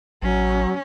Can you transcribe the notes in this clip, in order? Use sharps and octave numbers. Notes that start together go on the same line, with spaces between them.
A1 F#3 C#4